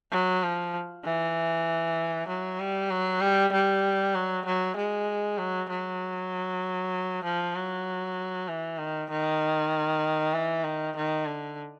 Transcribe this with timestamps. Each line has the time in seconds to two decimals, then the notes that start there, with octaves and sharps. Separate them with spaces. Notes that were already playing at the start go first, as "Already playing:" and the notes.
0.12 F#3
0.43 F3
1.04 E3
2.28 F#3
2.60 G3
2.90 F#3
3.21 G3
3.53 G3
4.15 F#3
4.46 F#3
4.76 G#3
5.38 F#3
5.70 F#3
7.24 F3
7.55 F#3
8.48 E3
8.78 D#3
9.10 D#3
10.34 E3
10.64 D#3
10.96 D#3
11.26 D3